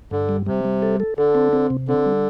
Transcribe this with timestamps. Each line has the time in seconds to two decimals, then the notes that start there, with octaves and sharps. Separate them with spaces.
0.11 G2 D3
0.29 G3
0.47 C3 G3
0.65 G3
0.82 A4
1.00 A4
1.17 D3 A4
1.35 C4
1.53 C4
1.70 C3
1.88 D3 C4
2.06 G3